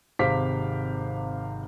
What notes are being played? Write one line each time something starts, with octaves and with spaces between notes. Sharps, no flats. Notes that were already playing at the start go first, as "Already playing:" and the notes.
G#1 C3 C5 F5 D6 B6